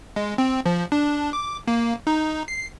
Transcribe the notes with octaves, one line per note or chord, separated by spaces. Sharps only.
G#3
C4
F3
D4
D6
A#3
D#4
C7